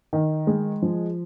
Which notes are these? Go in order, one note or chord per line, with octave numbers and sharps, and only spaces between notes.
D#3
G#3
F3